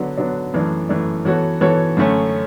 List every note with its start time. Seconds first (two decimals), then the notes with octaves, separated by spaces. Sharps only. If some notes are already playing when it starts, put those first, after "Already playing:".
Already playing: D3 F#3 B3 D4
0.17 D3 F#3 B3 D4
0.53 F#2 E3 A3 D4
0.89 F#2 E3 A3 D4
1.25 E3 B3 F#4 A4 C#5
1.61 E3 B3 F#4 A4 C#5
1.97 F#2 D3 A3 C#4